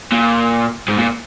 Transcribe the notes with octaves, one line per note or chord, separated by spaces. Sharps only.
A#2
G#2
A#2